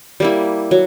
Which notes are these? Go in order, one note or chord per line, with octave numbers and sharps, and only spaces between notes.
G3 A#3 E4
F#3